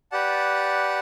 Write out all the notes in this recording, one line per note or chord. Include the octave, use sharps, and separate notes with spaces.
G4 B4 D5 F#5 A5